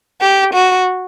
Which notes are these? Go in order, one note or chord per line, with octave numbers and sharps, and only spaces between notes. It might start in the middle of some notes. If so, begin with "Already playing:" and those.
G4
F#4